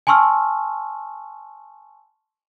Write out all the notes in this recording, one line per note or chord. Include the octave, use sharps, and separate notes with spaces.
G#5 A5 C6 C#6 E6 F6